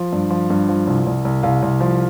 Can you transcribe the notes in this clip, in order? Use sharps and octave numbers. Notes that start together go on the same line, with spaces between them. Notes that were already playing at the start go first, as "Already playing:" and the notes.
Already playing: F3
G2
F3
G2
F3
C2
C2
C2
C2 F5
C2
F3